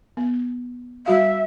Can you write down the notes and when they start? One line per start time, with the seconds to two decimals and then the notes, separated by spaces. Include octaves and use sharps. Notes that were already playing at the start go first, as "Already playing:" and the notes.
0.17 B3
1.06 G3 F#4 E5 F5